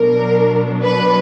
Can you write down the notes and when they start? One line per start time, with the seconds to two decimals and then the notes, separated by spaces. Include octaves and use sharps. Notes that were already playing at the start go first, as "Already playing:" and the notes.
Already playing: B2 F#3 B3 D4 A#4
0.83 B4